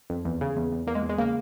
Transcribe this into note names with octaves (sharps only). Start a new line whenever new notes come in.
F2
E2
C#3
E2
E2
E2 A#3
G#3
E2
G#3
C#3 A#3